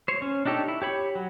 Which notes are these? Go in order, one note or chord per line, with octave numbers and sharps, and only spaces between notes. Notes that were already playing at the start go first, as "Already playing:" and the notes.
C5 C#5
C#4
D4 D#4 G4 A4 C#5
E4
G4 C#5 B5
F#3